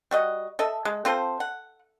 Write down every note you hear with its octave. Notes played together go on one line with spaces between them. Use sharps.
G3 F#4 D#5
A4 D#5 E5
G#3
C4 F4 A4 C5
F#5